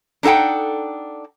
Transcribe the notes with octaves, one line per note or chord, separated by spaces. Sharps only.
D4 D#4 A4 F#5 G5